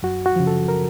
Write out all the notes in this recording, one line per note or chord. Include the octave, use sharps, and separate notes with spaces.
F#2 F#4
F#4
C#3 F3
A4
A#4